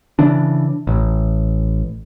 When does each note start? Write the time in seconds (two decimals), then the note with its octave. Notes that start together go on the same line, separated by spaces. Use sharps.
0.19 C#3 E3 D4
0.87 A1